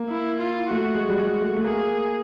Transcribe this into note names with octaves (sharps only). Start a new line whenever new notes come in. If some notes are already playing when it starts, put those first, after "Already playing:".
Already playing: A#3
E4
F4
A3 F#4
G#3
G3
G#3
A3
A3
A#3 G#4